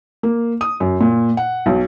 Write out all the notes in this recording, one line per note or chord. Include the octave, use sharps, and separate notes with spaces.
A#3
D#6
F#2
A#2
F#5
B1